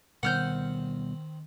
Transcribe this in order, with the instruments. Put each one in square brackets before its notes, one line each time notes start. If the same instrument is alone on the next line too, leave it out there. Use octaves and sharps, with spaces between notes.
[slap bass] B2 G3 B3 [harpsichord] D#3 C4 [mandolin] F#5 F6 G6